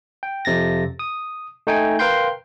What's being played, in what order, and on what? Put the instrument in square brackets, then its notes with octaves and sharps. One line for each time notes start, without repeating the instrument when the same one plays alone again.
[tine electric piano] G5
F2 C3 A6 A#6
D#6
A3 D#4 G5 G#5
A#4 B4 F5 G5 C6 G6